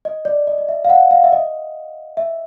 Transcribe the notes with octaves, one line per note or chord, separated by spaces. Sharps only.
D#5
D5
D#5
D#5
E5
F5
F#5
F5
E5
D#5
E5